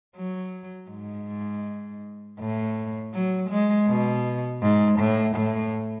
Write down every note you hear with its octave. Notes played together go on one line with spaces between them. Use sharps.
F#3
G#2
A2
F#3
G#3
B2
G#2
A2
A2